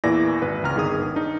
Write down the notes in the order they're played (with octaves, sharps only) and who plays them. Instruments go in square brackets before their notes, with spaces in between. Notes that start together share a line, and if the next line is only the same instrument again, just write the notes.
[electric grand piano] E2 A#2 E3 D5 D6 A#6
G#1 B4
C#2 A#5 F6
G1 D#3 G#4 D#6
D4 D#4